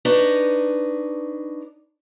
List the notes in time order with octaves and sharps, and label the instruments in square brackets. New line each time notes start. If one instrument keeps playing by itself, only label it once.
[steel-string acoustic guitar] D4 D#4 B4 C#5